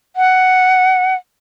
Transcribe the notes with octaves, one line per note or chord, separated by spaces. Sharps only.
F#5